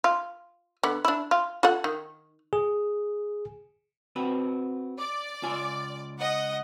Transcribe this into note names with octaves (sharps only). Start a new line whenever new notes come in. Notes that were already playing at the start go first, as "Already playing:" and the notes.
F4
D3 B3
D4 E4
F4
F4 A4 F#5
D#3
G#4
C4 F#4 B4
D5
C#2 F4 G#5
D#5 F#5